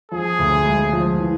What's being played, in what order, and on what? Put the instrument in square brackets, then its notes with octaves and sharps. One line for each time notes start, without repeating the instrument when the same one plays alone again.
[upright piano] F3 [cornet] G#4
[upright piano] D2
G#3
F3
E3